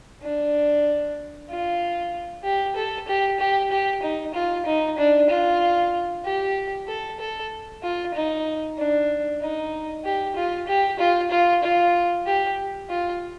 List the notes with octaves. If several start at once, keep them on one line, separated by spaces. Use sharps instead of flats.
D4
F4
G4
A4
G4
G4
G4
D#4
F4
D#4
D4
F4
G4
A4
A4
F4
D#4
D4
D#4
G4
F4
G4
F4
F4
F4
G4
F4